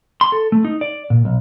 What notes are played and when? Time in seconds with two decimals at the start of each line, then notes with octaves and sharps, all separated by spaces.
0.21 C6
0.32 A4
0.52 A3
0.65 D#4
0.81 D5
1.10 A#2
1.25 B1